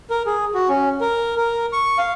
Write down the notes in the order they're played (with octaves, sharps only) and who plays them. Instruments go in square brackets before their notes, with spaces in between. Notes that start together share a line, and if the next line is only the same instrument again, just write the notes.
[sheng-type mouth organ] A#4
G#4
F#4
C#4
A#4
A#4
C#6
F5